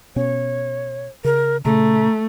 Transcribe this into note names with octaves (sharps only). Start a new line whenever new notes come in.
B2 B3 C#4 C#5
C#3 A#4
A#2 C#3 A3 A#5